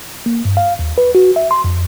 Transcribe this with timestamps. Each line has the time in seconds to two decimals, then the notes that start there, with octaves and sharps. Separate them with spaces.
0.26 A#3
0.45 G2
0.57 F5
0.79 D#2
0.98 B4
1.15 F#4
1.36 E5
1.51 C6
1.64 F2